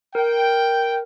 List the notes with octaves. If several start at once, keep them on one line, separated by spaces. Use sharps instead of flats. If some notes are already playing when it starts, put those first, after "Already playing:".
A#4 G5